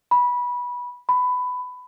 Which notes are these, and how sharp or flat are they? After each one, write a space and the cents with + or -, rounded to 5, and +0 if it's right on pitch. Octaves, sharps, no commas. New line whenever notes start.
B5 -15
B5 +15